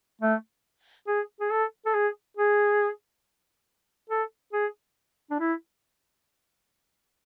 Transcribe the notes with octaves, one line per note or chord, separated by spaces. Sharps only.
A3
G#4
G#4
A4
A4
G#4
G#4
A4
G#4
D4
E4